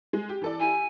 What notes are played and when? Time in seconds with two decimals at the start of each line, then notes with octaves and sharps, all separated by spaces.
0.13 G#3
0.29 G4
0.42 E3 A4 D5
0.60 E4 G4 G#5